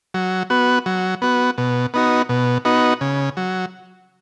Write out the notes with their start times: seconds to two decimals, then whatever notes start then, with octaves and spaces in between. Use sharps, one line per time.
0.14 F#3
0.50 B3 F#4
0.86 F#3
1.22 B3 F#4
1.58 B2
1.94 B3 D#4 F#4
2.29 B2
2.65 B3 D#4 F#4
3.01 C#3
3.37 F#3